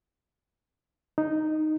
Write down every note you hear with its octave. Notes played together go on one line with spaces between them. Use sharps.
D#4